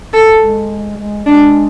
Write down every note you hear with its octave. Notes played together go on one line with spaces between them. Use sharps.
A4
G#3
G#3
G#3 D4